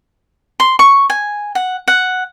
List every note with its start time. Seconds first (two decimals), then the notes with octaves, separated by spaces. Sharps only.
0.60 C6
0.79 C#6
1.10 G#5
1.55 F#5
1.88 F#5